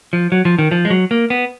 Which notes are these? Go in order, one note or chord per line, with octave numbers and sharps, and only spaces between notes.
F3
F#3
F3
D#3
F3
G#3
F#3
A#3
B3